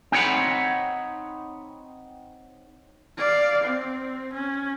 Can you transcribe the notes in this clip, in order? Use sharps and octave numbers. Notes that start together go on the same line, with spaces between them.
C4 D#4 C#5 F#5 B5
D5 F5
C4
C#4